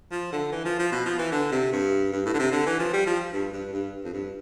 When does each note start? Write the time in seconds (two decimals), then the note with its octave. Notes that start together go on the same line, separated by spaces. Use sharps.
0.11 F3
0.32 D3
0.52 E3
0.65 F3
0.79 F3
0.92 B2
1.06 F3
1.19 E3
1.32 D3
1.52 C3
1.72 G2
2.12 G2
2.26 A2
2.34 D3
2.39 C3
2.52 D3
2.66 E3
2.79 F3
2.93 G3
3.06 F3
3.32 G2
3.53 G2
3.72 G2
4.04 F2
4.13 G2